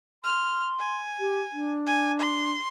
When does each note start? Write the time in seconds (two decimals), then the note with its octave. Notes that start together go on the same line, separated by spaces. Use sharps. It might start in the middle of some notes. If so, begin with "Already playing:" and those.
0.24 C6 F6
0.79 G#5
1.20 G4
1.53 D4
1.86 G#5
2.19 C6